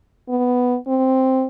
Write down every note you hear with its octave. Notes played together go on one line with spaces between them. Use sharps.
B3
C4